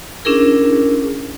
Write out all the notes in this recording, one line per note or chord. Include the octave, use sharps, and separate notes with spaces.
C#4 D4 E4 G#4 A#4